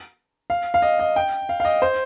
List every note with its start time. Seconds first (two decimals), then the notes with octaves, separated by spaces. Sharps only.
0.50 F5
0.74 F5
0.82 D#5
0.99 D#5
1.16 G5
1.49 F5
1.60 F5
1.65 D#5
1.82 C5